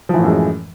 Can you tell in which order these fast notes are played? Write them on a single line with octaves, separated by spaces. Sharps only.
F3 E3 A2 F#2 G#3